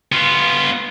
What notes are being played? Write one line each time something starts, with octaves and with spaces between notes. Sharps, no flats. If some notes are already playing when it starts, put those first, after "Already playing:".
B3 F4